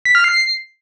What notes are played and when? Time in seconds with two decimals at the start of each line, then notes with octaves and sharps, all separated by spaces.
0.05 B6
0.15 F6
0.24 C7